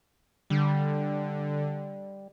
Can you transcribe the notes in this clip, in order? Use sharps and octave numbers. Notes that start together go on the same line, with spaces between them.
D3 G3